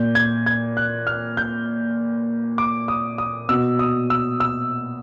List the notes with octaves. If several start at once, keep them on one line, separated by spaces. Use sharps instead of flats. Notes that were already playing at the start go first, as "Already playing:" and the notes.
Already playing: A#2 G6
G#6
G#6
F#6
F6
G6
D6
D#6
D#6
B2 E6
D#6
E6
E6